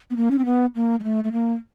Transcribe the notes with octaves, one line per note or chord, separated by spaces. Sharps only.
B3
A#3
C#4
C4
B3
A#3
G#3
A3
A3
A#3